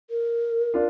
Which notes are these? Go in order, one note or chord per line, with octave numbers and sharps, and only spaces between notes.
A#4
D4 F4